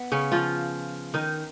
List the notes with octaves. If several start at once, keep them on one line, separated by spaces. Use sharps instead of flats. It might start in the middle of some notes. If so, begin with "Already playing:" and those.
Already playing: B3
C#3 C#4
F3 F4
D#3 D#4